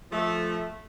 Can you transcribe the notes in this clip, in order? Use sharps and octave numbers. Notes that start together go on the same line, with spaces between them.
F3 A3